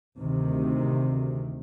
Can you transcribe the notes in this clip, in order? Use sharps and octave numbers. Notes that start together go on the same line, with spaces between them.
D2 C3 D#3